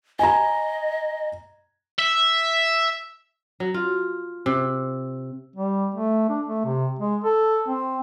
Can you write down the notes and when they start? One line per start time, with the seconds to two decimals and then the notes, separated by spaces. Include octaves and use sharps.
0.19 D#5 G#5 A#5
1.99 E5
3.60 F#3
3.74 F4
4.46 C3
5.56 G3
5.95 A3
6.29 D4
6.47 A3
6.65 C3
6.99 G#3
7.24 A4
7.68 C4